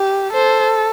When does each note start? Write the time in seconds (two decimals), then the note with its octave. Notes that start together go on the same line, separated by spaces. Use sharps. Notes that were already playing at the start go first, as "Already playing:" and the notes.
Already playing: G4
0.33 A4 C5